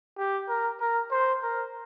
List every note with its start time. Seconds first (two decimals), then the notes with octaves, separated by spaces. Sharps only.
0.17 G4
0.49 A#4
0.80 A#4
1.11 C5
1.42 A#4